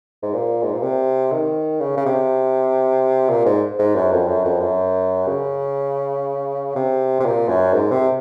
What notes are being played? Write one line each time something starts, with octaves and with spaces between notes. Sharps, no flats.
G#2
A#2
G#2
A#2
C3
D#3
C#3
C#3
C3
A#2
G#2
G#2
F#2
F2
F#2
F2
F#2
C#3
C3
C3
A#2
F#2
G#2
C3